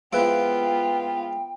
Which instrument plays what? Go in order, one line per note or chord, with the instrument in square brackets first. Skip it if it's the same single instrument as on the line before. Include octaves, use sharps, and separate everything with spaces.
[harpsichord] F3 G#3 E4 [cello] B3 F4 [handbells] B4 D7 [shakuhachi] G5